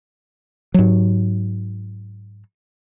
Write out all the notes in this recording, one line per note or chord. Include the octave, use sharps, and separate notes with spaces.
G#2 F#3